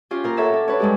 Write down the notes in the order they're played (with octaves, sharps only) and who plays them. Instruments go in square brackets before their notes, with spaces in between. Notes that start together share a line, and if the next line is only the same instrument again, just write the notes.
[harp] C#4 F4 G4
A#2 A#4
A4 C#5 E5 F#5 A5
D4
D4 B4 C#5
G2 G#3 G4